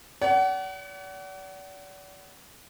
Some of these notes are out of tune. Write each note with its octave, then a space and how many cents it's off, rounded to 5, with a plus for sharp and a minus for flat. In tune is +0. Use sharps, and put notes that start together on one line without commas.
D5 -40 F#5 +35